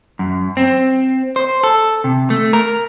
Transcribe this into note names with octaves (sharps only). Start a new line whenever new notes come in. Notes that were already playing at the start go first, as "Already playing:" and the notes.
F#2
C4
C5
A4
C3
A3
A#4